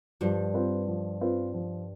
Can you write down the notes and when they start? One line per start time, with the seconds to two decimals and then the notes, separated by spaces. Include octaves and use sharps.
0.21 G2 F3 G3
0.54 C4 F4 B4
0.88 F3
1.21 C4 F4 B4
1.54 F3